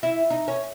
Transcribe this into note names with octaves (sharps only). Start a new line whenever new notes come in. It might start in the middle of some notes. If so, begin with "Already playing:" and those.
E4
D#4
C#4